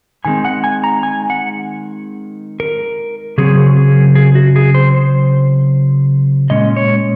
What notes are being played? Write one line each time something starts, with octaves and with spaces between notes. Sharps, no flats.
D#3 G#3 C4 G#5
F#5
G#5
A#5
G#5
F#5
A#4
C#3 F#3 C4 G#4
G#4
G#4
F#4
G#4
C5
C5
A#2 G#3 C#4 D#5
C#5